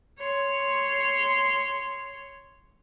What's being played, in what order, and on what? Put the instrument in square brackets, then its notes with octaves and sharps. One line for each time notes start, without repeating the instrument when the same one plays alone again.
[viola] C#5 C6